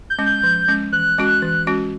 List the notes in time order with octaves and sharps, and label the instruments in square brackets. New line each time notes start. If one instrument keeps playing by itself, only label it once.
[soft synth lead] G6
[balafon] G#3 C#4
[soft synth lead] G6
[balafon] F3
G#3 C#4
[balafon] E3 [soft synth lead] F#6
[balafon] G#3 C#4 F#4
E3
G#3 C#4 F#4